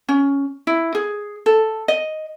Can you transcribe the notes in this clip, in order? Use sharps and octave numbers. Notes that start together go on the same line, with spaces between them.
C#4
E4
G#4
A4
D#5